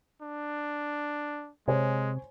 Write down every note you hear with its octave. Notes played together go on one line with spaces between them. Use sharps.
D4
C3 G#3 C5 C#5 G#5